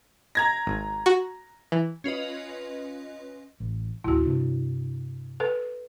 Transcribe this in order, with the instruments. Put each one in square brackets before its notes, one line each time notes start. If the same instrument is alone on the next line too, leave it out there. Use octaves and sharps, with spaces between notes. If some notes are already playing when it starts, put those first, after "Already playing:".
[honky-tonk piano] A#5 G#6 A#6
[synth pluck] G#1
F#4
E3
[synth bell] C#4 F4 B4 D#5
[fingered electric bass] A1
[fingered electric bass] A1 D2 [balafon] E4 F#4
[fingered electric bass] G2 C3 D4
[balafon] A4 B4